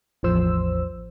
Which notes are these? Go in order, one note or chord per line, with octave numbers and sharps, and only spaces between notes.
A1 E2 F3 C5 E6